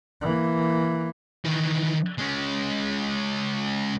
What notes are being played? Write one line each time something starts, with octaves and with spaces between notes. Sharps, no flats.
E3 A#3
D#3 E3
G#3 C#4